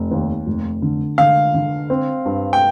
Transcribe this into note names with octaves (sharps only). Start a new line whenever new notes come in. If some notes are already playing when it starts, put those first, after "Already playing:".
Already playing: F1
D#2
F1
D3
D3 F5
D3
C4
G2
G5